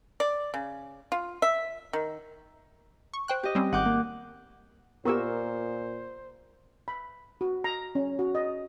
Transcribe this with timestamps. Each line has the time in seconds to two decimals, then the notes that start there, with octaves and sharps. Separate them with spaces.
0.20 D5
0.54 C#3
1.12 F4
1.42 E5
1.93 D#3
3.14 C#6
3.28 C5 G5 F#6
3.43 G4 D#5
3.55 G3 C4 C#4
3.73 G#1 F#5 D6 G6
3.85 A#3
5.05 A#2 B3 F4 G4 A#4 C5 C#6 E6
6.88 B5
7.41 F#4
7.64 A#5
7.95 C#4
8.19 F#4
8.35 D#5